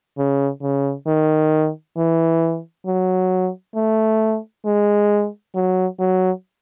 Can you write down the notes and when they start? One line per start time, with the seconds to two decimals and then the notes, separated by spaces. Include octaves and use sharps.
0.18 C#3
0.62 C#3
1.07 D#3
1.97 E3
2.86 F#3
3.75 A3
4.65 G#3
5.55 F#3
6.00 F#3